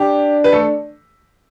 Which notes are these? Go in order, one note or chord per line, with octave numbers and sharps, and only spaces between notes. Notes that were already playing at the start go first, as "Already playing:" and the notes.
Already playing: D4 G4
B4
A3 A4